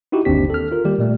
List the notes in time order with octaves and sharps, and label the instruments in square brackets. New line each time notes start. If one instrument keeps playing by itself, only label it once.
[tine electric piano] D#4 E4 F#4 G4
G1 D#2 C4 D4 G4 B6
A4 F6
F4 A#4
D#3 G3 A#3 G4
A#2 G3 A3